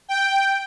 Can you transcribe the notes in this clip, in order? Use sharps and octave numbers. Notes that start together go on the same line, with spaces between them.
G5